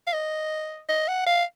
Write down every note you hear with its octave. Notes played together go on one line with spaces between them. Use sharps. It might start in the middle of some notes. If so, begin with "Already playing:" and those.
F5
D#5
D#5
F#5
F5